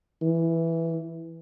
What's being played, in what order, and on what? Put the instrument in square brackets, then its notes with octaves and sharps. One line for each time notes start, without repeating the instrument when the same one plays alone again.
[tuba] E3